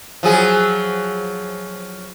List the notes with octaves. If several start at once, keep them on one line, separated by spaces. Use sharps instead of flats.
F3 F#3 G#4